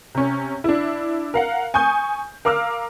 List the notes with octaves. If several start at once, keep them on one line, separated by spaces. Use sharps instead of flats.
C3 C#4
D4 E4
A#4 F5 F#5
G#5 C#6 D#6 G6
A#4 F5 D6 E6 F6